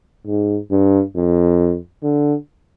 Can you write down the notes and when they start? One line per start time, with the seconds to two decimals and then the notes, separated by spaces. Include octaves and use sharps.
0.27 G#2
0.71 G2
1.16 F2
2.03 D3